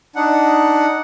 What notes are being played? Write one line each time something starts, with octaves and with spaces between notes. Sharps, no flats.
D4 D#4 F#5